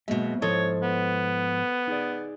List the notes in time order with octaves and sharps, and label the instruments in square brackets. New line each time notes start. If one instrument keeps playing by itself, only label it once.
[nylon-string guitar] B2 G#3 [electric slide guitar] F#3 A#3 E5
[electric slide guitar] G#2 F3 E4 [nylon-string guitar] A4 C5 D#5 [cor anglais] C#5
[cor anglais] B3
[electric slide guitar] D#4 G#4 D5